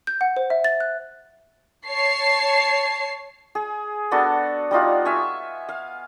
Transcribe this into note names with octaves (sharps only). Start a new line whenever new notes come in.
G6
F#5
C5
E5
A6
F#6
C#5 A5 C7
G#4
B3 D4 F#4 A4
G3 D#4 F4 F#4
E5 F5 G#5 C#6
F5